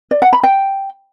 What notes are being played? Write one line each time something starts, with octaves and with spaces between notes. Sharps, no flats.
D5
F#5
B5
G5